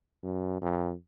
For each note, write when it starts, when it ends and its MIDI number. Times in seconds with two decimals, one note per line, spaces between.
0.23 0.61 42
0.62 0.93 41